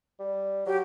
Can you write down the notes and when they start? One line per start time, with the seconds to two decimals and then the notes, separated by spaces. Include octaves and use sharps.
0.20 G3
0.66 F#3 G4